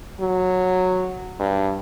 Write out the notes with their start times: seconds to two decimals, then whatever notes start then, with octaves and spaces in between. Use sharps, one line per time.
0.21 F#3
1.40 G2